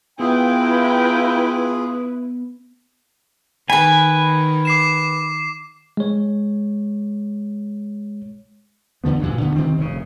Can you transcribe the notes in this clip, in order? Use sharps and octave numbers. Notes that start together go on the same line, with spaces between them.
B3 E4 F4 G#4 A#4 B4 F5 G5
D#3 B4 G#5 B5
D6 C7 E7
G#3 C#5
E2 D3 F3 B3
D2 G2 A#2
D2 D3 B3
C3 D#3 F3 C4
F1 F#2 C#3